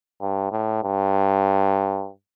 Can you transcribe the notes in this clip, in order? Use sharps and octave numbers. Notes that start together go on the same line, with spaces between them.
G2
A2
G2